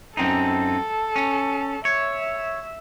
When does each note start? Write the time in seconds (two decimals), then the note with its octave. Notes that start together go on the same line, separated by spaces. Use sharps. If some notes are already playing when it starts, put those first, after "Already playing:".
0.17 F#2 C4 D#4 A4
1.16 C#4
1.85 C#5 E5